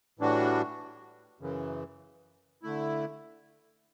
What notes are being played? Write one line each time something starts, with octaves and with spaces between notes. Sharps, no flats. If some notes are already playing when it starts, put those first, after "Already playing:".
A2 E3 G3 D4 F#4
F#2 C#3 E3
D3 A3 E4